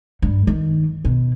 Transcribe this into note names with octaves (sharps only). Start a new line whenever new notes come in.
G2
D#3
B2